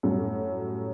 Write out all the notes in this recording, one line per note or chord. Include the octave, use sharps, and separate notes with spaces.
F#2 A2 F#3 G3